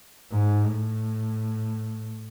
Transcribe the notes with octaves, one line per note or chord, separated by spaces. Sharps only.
G#2
A2